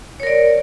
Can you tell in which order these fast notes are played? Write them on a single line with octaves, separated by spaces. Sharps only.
C#5 A#4 D5